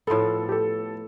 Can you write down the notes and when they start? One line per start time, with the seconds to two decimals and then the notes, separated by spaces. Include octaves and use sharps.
0.07 A2 F3 B3 A4
0.49 G4
0.52 A4